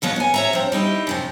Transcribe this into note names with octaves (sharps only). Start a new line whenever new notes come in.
D#2 F3 F#3 B3
C#4 G#5
C#5 E5 A#5
F3 C4
G3 D#4 E4 G4
F#2 C3 F3